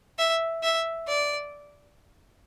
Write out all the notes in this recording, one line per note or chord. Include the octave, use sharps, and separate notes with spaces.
E5
E5
D5